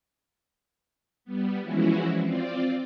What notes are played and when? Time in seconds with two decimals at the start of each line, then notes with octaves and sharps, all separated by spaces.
1.25 G3 B3
1.61 E3 F3 G#3 C#4 E4 F#4
2.21 C4 F4 D5